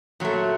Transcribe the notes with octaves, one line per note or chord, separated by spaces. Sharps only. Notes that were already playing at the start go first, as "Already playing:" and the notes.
A#2 F#3 A3